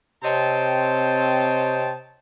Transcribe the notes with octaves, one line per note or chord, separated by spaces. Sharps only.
C3 C4 C#5 D#5 G5 A5